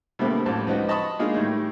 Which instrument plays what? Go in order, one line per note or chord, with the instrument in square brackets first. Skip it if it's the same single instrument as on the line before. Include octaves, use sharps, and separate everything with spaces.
[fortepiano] B2 D3 G3 A3 A#3 C4
A1 F3 G3 A5
C#2 G#2 F3 D#4 F#4 B4
D#5 A5 B5 C#6 D#6
G#3 A#3 D4 D#4 F4 G#4
A2 D#3 G3